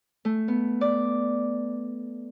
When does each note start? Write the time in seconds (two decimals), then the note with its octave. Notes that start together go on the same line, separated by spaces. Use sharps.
0.25 A3
0.48 B3
0.81 D5